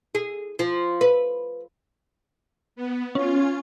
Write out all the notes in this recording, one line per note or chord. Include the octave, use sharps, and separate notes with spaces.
G#4
F3
B4
B3
C#4 F4